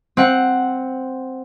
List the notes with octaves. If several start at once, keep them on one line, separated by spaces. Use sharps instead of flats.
C4 F#5